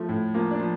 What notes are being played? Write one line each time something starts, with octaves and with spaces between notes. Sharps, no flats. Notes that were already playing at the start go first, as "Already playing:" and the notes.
Already playing: F3 A3
A2
F3 A#3
D4
F3